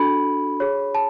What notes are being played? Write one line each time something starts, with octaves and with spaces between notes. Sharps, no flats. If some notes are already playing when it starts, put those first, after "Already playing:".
Already playing: D4 F#4 A4 B5
G#4 C#5
A5